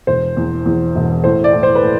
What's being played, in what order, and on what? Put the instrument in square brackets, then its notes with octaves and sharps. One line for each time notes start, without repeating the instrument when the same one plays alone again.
[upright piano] E1 C5
E2
E2
E1
A2 C5
D5
A2
C5
B4
A2